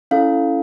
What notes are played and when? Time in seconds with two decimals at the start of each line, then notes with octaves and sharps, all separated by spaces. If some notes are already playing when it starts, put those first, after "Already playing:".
0.11 C#4 E4 A4 F5